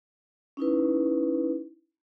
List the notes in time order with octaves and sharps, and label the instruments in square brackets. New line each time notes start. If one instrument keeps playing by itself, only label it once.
[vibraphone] C#4 D#4 E4 B4